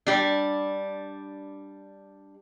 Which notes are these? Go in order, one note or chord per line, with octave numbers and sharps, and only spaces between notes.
G3 D4